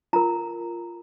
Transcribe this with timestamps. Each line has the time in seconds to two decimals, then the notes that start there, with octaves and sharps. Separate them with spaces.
0.13 F4 A#4 A#5